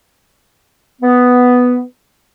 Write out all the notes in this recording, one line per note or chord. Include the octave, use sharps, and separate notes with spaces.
B3